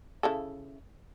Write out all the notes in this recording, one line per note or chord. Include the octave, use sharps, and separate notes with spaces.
C#3 E4 A4